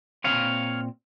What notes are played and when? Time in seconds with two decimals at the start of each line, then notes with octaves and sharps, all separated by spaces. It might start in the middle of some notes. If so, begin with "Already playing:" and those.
0.24 A#2 F3 C4 C#5 F5